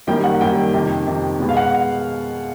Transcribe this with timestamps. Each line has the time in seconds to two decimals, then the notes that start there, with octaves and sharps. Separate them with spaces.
0.07 F#2 D#3 G3 A#3 G5
0.24 F#5
0.40 F#2 D#3 G3 A#3 G5
0.73 F2 C3 D#3
1.06 F2 C3 D#3
1.40 B2 G#3 B3
1.49 F5
1.57 F#5